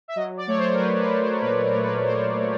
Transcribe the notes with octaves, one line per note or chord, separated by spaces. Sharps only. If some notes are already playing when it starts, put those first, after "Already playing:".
E5
F#3 D#5
D5
A3 C#5
C5
A#4
F#3 B4
B4
F#3
C5
A#2 B4
A#4
A3
B4
A3 C5
A3